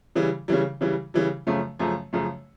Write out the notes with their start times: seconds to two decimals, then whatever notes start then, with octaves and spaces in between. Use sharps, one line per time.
0.15 C#3 E3 G3
0.48 C#3 E3 G3
0.81 C#3 E3 G3
1.14 C#3 E3 G3
1.47 F#2 C#3 F3 A3
1.79 F#2 C#3 F3 A3
2.13 F#2 C#3 F3 A3